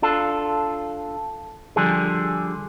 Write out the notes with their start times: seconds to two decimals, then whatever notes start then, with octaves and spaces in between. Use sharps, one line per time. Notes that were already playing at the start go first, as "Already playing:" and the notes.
0.02 D4 F4 A4
1.76 D3 F3 G3 G#4